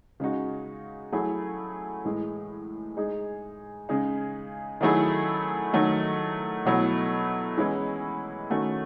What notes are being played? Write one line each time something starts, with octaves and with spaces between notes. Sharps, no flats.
C#3 G#3 D#4 F#4
F#3 A3 E4 G#4
A2 E3 G#3
G#3 D#4 G#4
C#3 G#3 D#4 G#4
D#3 F#3 A3 E4 G#4
D#3 F#3 A3 D#4
B2 F#3 A3 E4
E3 G#3 C#4 E4
D#3 A3 C#4 F#4